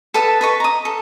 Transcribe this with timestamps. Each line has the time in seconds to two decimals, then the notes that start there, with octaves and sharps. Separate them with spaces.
0.14 A4 B4 A5 D#6
0.41 B4 D#5 C#6
0.60 A#5 D#6
0.85 A4